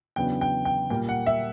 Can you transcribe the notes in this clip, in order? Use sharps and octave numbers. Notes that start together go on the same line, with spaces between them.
E2 C#3 F#3 B3 D4 G5
G5
G5
A#2 G3 A#3 G5
F#5
E5